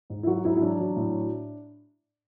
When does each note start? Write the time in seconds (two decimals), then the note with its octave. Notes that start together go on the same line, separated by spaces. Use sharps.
0.10 G#2
0.23 E4
0.27 F#3 F#4
0.45 G#2 E4
0.56 E4
0.61 F#3 D4
0.80 F#3
0.96 A2